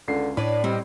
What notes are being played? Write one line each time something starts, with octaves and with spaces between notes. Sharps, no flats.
C#2 D3 C7
A2 D4 B4 C#5 D5
G3 C4 D#4